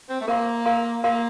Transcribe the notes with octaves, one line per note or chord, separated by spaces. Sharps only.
C4
A3
A#3 A#4 F5 C6
A#4 F5 C6
A#3 A#4 F5 C6